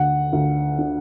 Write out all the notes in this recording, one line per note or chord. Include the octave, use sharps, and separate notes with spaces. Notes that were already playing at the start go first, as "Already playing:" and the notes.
Already playing: D2 F#5
D2
D3